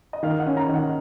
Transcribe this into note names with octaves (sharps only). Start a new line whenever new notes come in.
D#5
D#3 F5
F#5
C#4
A#5
D#3
F#5